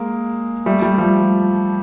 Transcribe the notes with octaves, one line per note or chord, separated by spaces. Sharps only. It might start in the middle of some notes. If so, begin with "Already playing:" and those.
Already playing: G#3 A#3
G3 A3
G3 A3
F3 G3